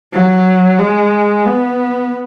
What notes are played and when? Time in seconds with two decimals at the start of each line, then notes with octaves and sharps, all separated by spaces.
0.13 F#3
0.79 G#3
1.45 B3